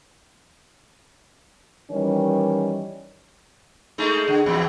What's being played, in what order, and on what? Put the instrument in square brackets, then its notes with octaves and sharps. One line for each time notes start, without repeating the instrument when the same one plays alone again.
[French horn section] D#3 E3 G3 C#4
[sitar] G#3 A3 D#4
D3
E2 B2